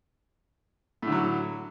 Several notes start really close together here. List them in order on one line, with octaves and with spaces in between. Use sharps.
A2 D3 F#3